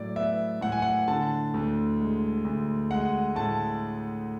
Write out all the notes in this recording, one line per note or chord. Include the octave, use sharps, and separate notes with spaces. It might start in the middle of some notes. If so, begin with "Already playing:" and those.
Already playing: A2 F#3 D5
B3 E5
A2 F#5
G#5
F#5
D3 A5
D2
G#3
D2
G#3 F#5
A2 A5